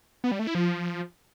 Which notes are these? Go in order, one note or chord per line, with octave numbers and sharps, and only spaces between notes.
B3
G3
A3
E4
F3